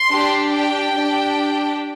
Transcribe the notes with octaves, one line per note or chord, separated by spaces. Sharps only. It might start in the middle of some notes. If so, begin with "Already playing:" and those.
Already playing: C6
D4 G4
G5
D4 G4